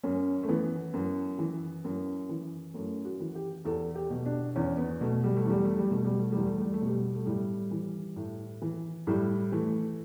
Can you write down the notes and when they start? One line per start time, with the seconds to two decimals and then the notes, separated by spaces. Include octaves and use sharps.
0.03 F#2 C#4
0.43 A3
0.49 E3 B3
0.94 F#2
1.38 E3
1.84 F#2
2.29 E3
2.74 F#2 A3
3.05 F#4
3.20 E3
3.35 G4
3.65 E2 A4
3.95 G4
4.10 B2
4.26 D4
4.56 E2 C#4
4.77 B3
5.01 B2 A3
5.24 G3
5.36 A3
5.45 E2 G3
5.64 A3
5.77 G3
5.91 B2 A3
6.05 G3
6.19 A3
6.32 E2 G3
6.46 A3
6.59 G3
6.73 A3
6.82 B2 G3
7.14 A3
7.26 A2 G3
7.71 E3
8.16 A2
8.62 E3
9.07 A2 G3
9.52 E3 A3